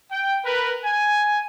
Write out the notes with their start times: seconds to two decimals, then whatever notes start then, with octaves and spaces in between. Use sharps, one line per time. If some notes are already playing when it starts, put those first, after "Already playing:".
0.11 G5
0.45 A#4 B4
0.84 G#5